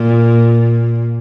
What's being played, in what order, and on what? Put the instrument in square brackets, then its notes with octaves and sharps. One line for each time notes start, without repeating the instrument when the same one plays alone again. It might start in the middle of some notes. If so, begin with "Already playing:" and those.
Already playing: [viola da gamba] A#2